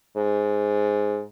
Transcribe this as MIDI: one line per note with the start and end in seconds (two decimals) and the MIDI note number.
0.17 1.23 44